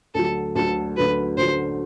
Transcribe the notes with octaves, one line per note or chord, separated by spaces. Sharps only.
D2 D3 F#3 A4
D2 D3 F#3 A4
D2 D3 F#3 B4
D2 D3 F#3 C5